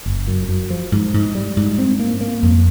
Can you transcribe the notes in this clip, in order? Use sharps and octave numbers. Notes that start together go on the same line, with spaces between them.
F#1
F#2
F#2
F3
G#2
G#2
G3
G#2
C4
A#3
A#3
F2